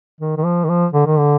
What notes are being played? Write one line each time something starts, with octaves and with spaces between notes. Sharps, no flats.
D#3
D#3
F3
D#3
F3
D3
D#3
D3